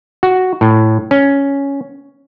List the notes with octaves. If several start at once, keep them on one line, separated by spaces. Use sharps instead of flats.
F#4
A2
C#4